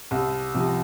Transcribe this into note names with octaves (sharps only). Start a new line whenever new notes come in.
C2
C3 F3